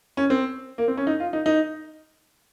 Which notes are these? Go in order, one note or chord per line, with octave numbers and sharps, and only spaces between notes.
C#4
C4
A#3
C4
C#4
D#4
F4
D#4
D#4